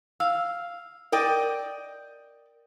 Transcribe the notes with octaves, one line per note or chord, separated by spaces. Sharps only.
F5 E6
A#4 D5 D#5 G5